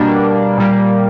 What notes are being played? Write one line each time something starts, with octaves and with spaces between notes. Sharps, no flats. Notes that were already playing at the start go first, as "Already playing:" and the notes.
Already playing: B2 G3 A#3 D4
A#2 G3 A#3